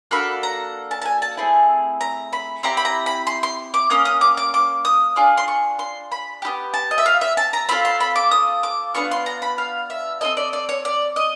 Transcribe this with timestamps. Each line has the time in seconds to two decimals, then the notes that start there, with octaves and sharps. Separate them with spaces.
0.11 A#3 D4 F#4 A4 B5
0.43 A#5
0.91 A5
1.02 A5
1.06 G#5
1.22 A5
1.37 A3 C4 E4 G#4
2.01 A#5
2.33 B5
2.63 C4 E4 G4 A#5
2.77 B5
2.85 A#5
3.06 B5
3.27 C6
3.43 C6
3.74 D6
3.90 A#3 C#4 D#6
4.05 D#6
4.21 D6
4.37 D6
4.54 D6
4.85 D#6
5.16 D4 F4 G#4 D6
5.37 C6
5.48 C#6
5.79 C6
6.12 B5
6.42 B3 E4 G4
6.74 A5
6.91 D#5
6.98 E5
7.06 F5
7.21 E5
7.37 A5
7.53 A#5
7.69 C4 F4 A4 B5
7.85 C6
8.00 B5
8.16 D6
8.31 D#6
8.63 D6
8.95 B3 D4 F4 C#6
9.11 C6
9.26 A#5
9.42 B5
9.58 F5
9.90 E5
10.21 C4 E4 A4 D#5
10.37 D5
10.53 D5
10.69 C#5
10.85 D5
11.16 D#5